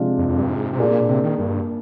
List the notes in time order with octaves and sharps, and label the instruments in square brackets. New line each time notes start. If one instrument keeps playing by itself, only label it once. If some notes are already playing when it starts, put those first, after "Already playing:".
Already playing: [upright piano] C3 F3 G#3 D4 F4
[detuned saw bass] F2
F2
G2
G#2
C3
[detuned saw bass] A#2 [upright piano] A#3 D4 G#4 D5
[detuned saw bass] C3
D#3
G2